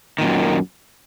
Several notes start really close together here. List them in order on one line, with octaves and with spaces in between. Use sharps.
D#3 A#2 F#2